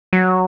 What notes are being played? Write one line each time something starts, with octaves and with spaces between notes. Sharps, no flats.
F#3